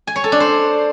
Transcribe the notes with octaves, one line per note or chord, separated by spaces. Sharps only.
G#5
C#5
A4
D4
C5